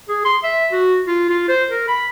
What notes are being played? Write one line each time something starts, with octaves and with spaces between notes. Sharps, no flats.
G#4
C6
E5
F#4
F4
F4
C5
A#4
B5